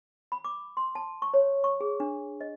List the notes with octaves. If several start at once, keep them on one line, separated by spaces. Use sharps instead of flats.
B5
D6
C6
A5
C#6
C#5
C#6
G#4
D4
D#5